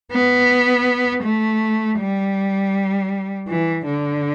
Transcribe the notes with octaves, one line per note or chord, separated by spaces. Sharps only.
B3
A3
G3
E3
D3